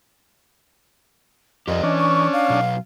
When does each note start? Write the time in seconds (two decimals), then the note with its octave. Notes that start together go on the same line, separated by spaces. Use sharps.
1.68 F2 G4 A#4 D5 D#5
1.83 E3 C#4 D4
1.98 C#6
2.33 F5
2.50 B2 F#3